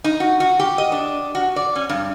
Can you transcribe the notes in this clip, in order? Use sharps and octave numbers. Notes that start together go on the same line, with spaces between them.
D#4
F#4
F#4
G4
D#5
D4
F#4
D5
C#4
G2